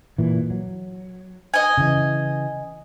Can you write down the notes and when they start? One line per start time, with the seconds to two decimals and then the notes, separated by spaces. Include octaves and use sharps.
0.18 A#2 E3
0.50 F#3
1.54 D#5 G#5
1.77 C#3 E3